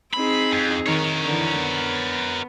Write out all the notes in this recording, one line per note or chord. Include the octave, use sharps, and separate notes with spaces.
C4 D#4 G#4 B5
F2
D#3 A#4 C#5
D3 E3
B3